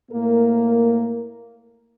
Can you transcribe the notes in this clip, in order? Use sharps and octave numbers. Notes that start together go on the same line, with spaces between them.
A2 A#3 A#4